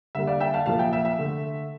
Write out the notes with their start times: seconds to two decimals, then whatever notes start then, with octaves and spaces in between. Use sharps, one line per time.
0.15 D3 G3 A#3 E5
0.27 D5 F5
0.40 E5 G5
0.54 F5 A5
0.66 A#2 F3 A#3 F5 A5
0.79 E5 G5
0.93 E5
1.05 E5
1.18 D3 A3